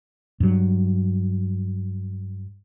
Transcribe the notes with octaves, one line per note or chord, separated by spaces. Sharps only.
G2 F#3